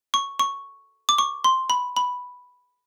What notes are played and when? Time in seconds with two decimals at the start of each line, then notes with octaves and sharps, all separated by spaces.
0.14 C#6
0.39 C#6
1.09 D6
1.18 C#6
1.44 C6
1.70 B5
1.97 B5